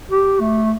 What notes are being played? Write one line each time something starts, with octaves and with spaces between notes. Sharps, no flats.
G4
A3